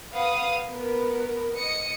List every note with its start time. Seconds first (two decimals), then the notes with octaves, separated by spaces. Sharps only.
0.12 B4 F5 F#5 D#6
0.68 B3 A#4
1.56 D#5 D#6 C#7